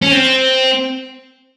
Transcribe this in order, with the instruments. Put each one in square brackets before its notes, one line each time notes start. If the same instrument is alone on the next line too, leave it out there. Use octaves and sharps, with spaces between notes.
[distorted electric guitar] C#4
C4